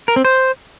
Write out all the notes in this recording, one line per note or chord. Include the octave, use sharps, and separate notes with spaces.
A#4
C4
C5